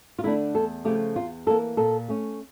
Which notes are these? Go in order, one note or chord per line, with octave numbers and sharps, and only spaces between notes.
F4
D3 A3 D4 E4
E2 A4
C#3 F3 A3 G4
E2 F4
E3 G3 A#3 A4
A#2 A4
A3 C#4